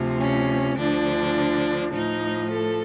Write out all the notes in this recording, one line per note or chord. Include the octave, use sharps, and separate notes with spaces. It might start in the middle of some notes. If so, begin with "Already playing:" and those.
Already playing: D2 C3 F3
C#4
D2 D3 F3 D4
A2 F3 D#4
A4